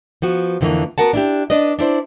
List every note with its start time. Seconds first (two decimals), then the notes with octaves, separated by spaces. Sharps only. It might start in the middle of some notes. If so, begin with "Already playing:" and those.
0.22 F3 B3 F#4
0.61 F2 D3 E3 A3 A#3
0.98 B3 F#4 A#4 F#5 A5
1.13 D4 E4 G4
1.50 D4 B4 D5 D#5
1.79 D4 E4 C5 D5